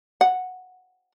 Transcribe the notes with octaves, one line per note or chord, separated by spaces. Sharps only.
F#5